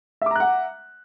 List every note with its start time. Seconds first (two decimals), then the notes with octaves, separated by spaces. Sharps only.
0.22 E5
0.26 D6
0.31 A#5
0.36 F#6
0.40 F#5